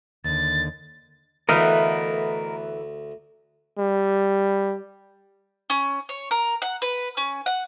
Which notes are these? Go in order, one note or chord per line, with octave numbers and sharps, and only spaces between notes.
D#2 D3 A6
D2 E3 A3 B3 A#4 D#5 F5
G3
C#4
C#5
A#4
F#5
B4
C#4
F#5